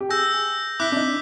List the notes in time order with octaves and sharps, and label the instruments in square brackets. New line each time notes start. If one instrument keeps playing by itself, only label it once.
[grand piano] G4
[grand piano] G#4 [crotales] E6 G6 A#6
[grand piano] E4 [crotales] D6 F#6 B6
[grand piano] D4
D#4